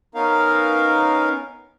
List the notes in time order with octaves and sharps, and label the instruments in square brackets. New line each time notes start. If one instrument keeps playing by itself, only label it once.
[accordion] B3 C#4 D#4 A#4 F5